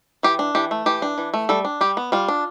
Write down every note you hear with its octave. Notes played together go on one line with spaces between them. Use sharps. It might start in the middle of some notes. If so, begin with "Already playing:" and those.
E3 G4
D4
E3 G4
A3
E3 G4
D4
E3
A3
G3 A4
D4
G3 G4
B3
G3 F4
D4